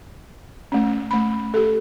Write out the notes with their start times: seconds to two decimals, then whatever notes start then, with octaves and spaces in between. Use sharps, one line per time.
0.72 A3 C#4
1.11 A3 B5
1.54 G4 A4